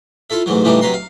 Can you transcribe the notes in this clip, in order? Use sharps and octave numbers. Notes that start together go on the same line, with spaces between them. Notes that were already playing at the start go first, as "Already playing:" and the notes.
E4 F4 A4 E5
A1 G#2 E3 F#3
A2 C#3 E3 G3 D4 D#4
C3 F#3 B4 A#5 C6
F5